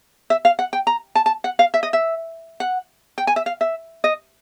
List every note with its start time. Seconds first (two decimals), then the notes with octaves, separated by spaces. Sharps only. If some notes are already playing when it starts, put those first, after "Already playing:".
0.30 E5
0.45 F5
0.59 F#5
0.73 G5
0.87 A#5
1.15 A5
1.26 A5
1.44 F#5
1.59 F5
1.74 E5
1.83 D#5
1.93 E5
2.60 F#5
3.18 G5
3.27 G#5
3.36 E5
3.46 F5
3.61 E5
4.04 D#5